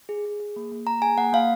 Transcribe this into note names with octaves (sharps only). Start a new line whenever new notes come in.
G#4
G#4
G#4
A#3
A#3
A#3 A#5
G#4 G#5
A#3 F#5
A#3 F5